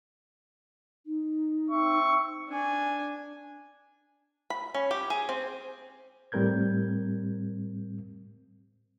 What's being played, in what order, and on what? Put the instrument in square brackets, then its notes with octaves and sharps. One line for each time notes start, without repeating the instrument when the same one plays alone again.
[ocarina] D#4
[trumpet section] C4 E5 C#6
[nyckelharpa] D4 G#5
[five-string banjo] B5
C#4
G4
G#4
C4
[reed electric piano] A2 G3 C4 A#4 G6 G#6